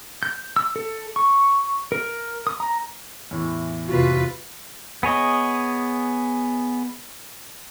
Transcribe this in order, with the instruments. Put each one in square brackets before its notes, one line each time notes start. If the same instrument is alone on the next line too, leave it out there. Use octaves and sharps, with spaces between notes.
[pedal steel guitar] G6
E6
A4
C#6
A#4
D#6
A#5
[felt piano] E2 A2 E3
[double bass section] F1 C3 [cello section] F4 B4 [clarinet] F#4
[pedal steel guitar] B3 G#4 C#5 D#5